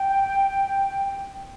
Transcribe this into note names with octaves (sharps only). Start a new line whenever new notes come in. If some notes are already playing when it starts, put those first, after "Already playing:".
Already playing: G5